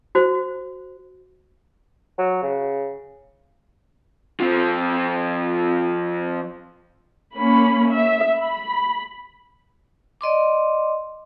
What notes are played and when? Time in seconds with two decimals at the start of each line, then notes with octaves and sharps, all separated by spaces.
0.15 F#4 C5
2.18 F#3
2.43 C#3
4.40 F3 C4
7.36 A#3 C#4 B5
7.92 E5
8.39 B5
10.21 D5 D#5 C6 D6